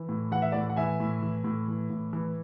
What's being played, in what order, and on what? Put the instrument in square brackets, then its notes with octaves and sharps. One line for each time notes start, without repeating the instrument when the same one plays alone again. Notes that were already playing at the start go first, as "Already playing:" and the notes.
Already playing: [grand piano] E3
A2
E3 F#5
E5
A2 D5 F#5
F#5
E3 E5 G#5
A2
E3
A2
E3
A2
E3